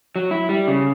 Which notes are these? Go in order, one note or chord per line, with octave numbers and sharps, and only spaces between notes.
F#3
E4
G3
C#3